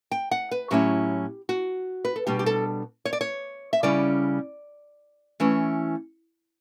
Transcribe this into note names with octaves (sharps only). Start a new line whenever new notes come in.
G5
F#5
B4
A2 F#3 C#4 E4 G4
F#4
B4
A4
B2 G3 D4 G4
G4
A4
C#5
D5
C#5
E5
C#3 G3 C#4 E4 D5
E3 A3 C#4 E4